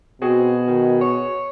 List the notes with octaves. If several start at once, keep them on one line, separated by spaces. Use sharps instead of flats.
B2 C4 F#4 G#4
D#3
C#5